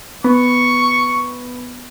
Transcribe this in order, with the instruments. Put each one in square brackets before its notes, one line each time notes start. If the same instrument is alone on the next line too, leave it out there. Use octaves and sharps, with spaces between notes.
[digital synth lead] B3 [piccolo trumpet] C#6